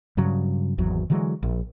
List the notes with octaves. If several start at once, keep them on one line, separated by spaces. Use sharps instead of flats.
G2 C#3 F#3
G#1 E2 F#3
D3 E3 F#3 G#3
A#1